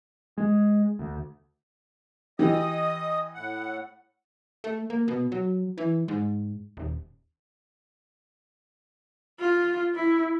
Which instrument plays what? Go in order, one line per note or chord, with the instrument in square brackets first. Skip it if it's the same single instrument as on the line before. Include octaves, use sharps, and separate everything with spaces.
[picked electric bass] G#3
D2
[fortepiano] E3 G4 [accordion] D#5 D#6
[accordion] A2 F#5
[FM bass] A3
A#3
B2
F#3
E3
G#2
D#1
[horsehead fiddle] F4
E4